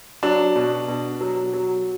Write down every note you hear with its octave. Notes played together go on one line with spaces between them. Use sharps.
F#3 D4
B2
B2
F#3
F#3